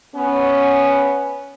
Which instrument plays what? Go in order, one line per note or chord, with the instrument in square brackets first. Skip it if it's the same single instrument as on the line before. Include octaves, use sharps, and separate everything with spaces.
[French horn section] B3 C#4